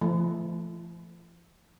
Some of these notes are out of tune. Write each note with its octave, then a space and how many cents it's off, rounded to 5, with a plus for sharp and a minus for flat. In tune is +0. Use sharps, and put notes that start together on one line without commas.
F3 -40 A3 +0